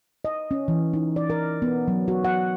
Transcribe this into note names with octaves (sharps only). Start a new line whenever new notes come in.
D#5
C#4
E3
D#4
D5
A#4
B3
F#3
F#4
F#5